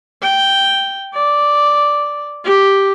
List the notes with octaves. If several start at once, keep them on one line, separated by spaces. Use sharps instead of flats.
G5
D5
G4